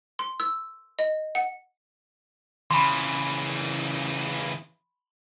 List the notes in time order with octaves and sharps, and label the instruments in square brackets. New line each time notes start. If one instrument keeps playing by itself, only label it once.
[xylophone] C6
E6
D#5
F#5
[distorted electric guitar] C#3 E3 [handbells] B5 C6